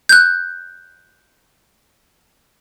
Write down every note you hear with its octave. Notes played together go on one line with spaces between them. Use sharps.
F#6 G6